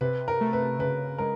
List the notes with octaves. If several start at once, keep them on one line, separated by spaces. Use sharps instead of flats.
C3 B4
A#4
A3
B4
C#3 B4
G#3 A#4